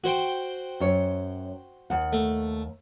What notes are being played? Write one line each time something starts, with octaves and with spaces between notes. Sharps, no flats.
F#4 C5 G5
F#2 C#5
D#2 F#5
A3